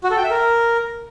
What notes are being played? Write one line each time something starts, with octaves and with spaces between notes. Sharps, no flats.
F#4
A4
G5
E5
A#4